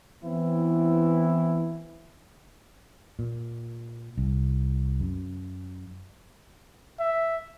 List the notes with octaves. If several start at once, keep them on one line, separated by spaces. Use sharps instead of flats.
E3 B3 C4 E4
A#2
C2
F#2
E5